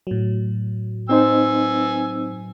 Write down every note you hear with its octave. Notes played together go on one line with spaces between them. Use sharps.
A2 F#3
C4 D#4 C5 G#5 E6